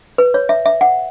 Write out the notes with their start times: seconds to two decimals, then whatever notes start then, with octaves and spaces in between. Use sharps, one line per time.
0.18 B4
0.34 C#5
0.49 E5
0.66 E5
0.81 F#5